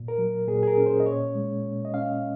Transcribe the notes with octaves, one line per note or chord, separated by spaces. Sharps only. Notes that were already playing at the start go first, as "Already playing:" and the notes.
Already playing: A#2
A#4
F#3
A#2 G#4
G#4
A#4
C#4
C5
D#5
A#2 C#5
G#3
A#2
D#5
C#4 F5